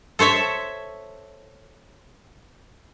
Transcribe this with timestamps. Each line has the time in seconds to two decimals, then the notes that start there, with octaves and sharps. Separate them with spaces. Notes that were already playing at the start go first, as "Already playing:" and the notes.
0.19 A4 C5 C#5 E5